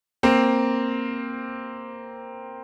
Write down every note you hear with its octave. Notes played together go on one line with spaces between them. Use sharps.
A#3 C4